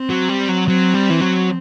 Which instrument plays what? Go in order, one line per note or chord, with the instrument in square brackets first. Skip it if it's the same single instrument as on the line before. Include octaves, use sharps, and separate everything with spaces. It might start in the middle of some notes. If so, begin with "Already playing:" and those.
Already playing: [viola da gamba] C4
[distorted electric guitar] F#3
G3
F#3
[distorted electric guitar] F#3 [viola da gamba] C4
[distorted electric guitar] G3
E3
F#3